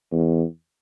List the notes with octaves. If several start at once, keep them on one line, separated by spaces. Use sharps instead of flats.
E2